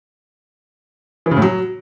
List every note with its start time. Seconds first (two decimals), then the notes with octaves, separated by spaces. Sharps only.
1.26 E3
1.31 C#3
1.37 A2
1.42 F#3